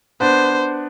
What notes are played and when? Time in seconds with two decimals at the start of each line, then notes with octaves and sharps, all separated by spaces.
0.21 B3 D4 C5